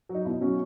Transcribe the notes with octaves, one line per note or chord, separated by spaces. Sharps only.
F#3
D#4
B2 E4
F#3 C#4